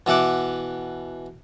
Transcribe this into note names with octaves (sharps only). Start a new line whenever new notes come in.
B2 E3 E5 F#5 D6